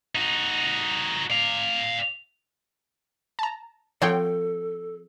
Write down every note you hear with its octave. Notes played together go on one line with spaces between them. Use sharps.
D#4 F#4
D5 F5
A5 A#5
F3 C4 A4 C#5 F#5 G5